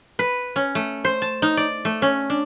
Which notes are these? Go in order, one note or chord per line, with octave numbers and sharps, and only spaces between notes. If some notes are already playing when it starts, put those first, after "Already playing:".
B4
C#4
A3
C5
A5
D#4
D5
A3
C#4
D4